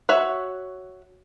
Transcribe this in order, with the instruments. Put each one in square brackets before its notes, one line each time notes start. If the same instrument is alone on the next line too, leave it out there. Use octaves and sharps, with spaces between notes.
[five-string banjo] F#4 C#5 E5 F#5